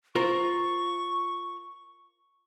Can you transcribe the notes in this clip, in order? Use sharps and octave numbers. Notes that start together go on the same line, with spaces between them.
F4 A#4 C5 C#6